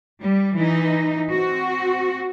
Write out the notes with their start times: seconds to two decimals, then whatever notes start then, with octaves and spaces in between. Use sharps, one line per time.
0.21 G3
0.56 E3 D#4
1.31 C4 F#4